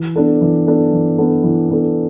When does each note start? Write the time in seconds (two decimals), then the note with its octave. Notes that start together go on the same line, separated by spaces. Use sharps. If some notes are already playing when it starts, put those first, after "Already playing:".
Already playing: E3
0.16 B3 D4 A4
0.41 E3
0.67 B3 D4 A4
0.92 E3
1.18 B3 D4 A4
1.44 E3
1.69 B3 D4 A4